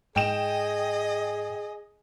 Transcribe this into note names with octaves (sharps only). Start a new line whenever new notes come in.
G#2 G#4 D#5 G5 E7